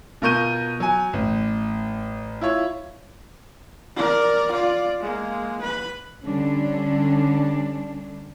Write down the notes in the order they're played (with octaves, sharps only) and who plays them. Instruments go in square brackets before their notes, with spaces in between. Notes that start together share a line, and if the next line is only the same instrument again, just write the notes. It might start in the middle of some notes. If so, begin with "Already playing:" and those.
[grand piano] B2 F4 A#4 C#6 G6 D#7
F#3 G#5
A1
E4 F4 C#5
[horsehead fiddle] A#4 D5
F4 D5
G#3 A#3
B4 B5
[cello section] D3 G3 C#4 D4